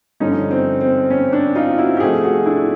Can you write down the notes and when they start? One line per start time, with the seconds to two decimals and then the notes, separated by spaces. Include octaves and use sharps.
0.20 G2 D3 F3 C#4 D#4
0.51 C4
0.81 C4
1.10 C#4
1.33 C4 D4
1.55 D#4 F4
1.78 E4 F#4
1.97 G4
2.00 C3 F3 A3 F#4 G#4
2.23 F#4 G#4
2.46 D4 E4